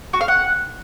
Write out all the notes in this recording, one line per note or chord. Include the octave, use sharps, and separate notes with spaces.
F#4
F5
F#5